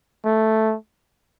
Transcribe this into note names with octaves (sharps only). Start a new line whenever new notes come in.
A3